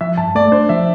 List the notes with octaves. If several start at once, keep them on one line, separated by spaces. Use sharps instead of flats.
F3 E5
G2 A5
A3 D5
D4 C5
F3 E5